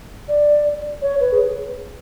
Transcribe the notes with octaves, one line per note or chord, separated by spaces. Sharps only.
D5
C#5
B4
G#4